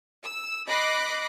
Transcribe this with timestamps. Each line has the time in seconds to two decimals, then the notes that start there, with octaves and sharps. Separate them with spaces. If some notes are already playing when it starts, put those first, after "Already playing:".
0.22 E6
0.67 D#5 B5 D6 F#6 A#6 C7